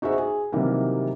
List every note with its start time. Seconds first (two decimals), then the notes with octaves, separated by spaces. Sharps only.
0.02 D#4 F#4 G#4 C5 E5
0.18 G#4
0.52 C3 D#3 E3 F#3 G3 A#3